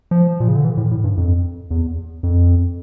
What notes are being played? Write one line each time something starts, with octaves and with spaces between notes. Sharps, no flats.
F3
A#2
C#3
D3
E3
A2
A2
G2
F2
E2
F2